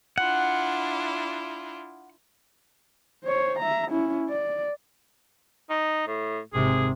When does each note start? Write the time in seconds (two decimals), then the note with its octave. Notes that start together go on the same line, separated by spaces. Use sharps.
0.18 D4 E4 F4 F#5
3.24 C5 C#5
3.59 E5 A#5
3.90 C#4 E4
4.29 D5
5.70 D#4
6.07 A2
6.53 G#1 C3 G#4